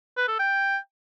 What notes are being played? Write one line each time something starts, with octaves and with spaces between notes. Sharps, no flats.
B4
A4
G5